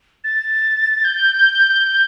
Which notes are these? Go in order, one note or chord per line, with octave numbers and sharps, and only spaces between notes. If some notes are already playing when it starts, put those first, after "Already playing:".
A6
G6